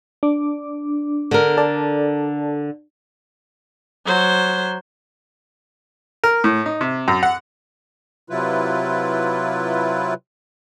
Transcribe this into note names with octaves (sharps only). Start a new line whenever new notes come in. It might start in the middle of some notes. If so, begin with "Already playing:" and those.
D4 D6
D3 A#4
A4 D5 A5
F#3 C5
A#4
A2
D#4
C3
F#2
F#5
C3 F#3 E4 F4 B4